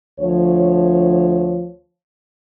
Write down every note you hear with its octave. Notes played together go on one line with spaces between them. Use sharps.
D2 F3 C#5